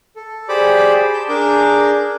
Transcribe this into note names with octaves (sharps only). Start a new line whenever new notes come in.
A4
G4 G#4 C5 D5 B5 D6
A5 G6
D4 G#4 A#4 D6 G6